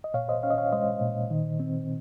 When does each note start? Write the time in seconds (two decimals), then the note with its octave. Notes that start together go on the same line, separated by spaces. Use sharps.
0.04 D#5
0.14 A#2 C#5 F5
0.29 C5 D#5
0.43 C#4 C#5 F5
0.50 D#5
0.58 C#5 F5
0.72 G#3 C5 D#5
1.01 A#2
1.30 D#3
1.60 C4